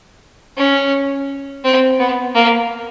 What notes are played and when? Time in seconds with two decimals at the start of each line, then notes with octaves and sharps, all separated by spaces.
0.58 C#4
1.64 C4
1.99 B3
2.35 A#3